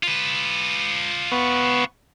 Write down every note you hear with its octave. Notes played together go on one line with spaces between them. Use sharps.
F4 B4
B3 C#6